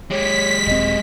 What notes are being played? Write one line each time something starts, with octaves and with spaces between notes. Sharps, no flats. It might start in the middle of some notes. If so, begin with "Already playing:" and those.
G#3 G4 C#5 B6
D#1 C4 D#5